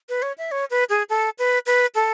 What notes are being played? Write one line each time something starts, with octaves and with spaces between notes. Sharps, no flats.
B4
C#5
E5
C#5
B4
G#4
A4
B4
B4
A4